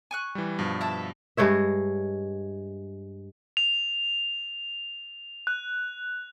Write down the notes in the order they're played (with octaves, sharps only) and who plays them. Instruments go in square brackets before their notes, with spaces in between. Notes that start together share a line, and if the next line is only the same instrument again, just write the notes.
[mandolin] G#5 C#6 F#6
[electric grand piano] E3 G3
G2 B2 F3
[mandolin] E4 E5 A5
[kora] G2 G#3 C#5 E5
[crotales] F7
F#6